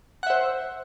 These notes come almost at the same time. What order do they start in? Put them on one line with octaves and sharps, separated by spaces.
F#5 E5 C5